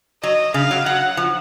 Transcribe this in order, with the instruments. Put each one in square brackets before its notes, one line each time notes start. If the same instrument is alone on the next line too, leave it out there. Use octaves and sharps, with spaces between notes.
[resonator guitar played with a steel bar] F#3 [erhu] D#5
[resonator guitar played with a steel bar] C#3 [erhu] F5
[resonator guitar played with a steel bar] F#3
[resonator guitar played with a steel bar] F#3 [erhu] F#5
[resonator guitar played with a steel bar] F3